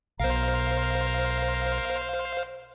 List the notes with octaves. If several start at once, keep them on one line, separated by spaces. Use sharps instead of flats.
B1 B2 A#4 C5 F5